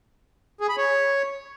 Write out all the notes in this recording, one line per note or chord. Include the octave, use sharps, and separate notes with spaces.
G#4
B5
C#5